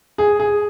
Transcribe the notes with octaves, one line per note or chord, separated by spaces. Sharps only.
G#4
G#4